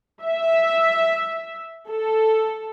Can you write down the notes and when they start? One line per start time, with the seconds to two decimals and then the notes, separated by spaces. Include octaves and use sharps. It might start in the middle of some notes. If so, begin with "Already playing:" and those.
0.24 E5
1.88 A4